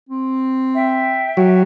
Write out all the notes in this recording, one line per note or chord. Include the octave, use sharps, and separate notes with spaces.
C4
E5 G5
F#3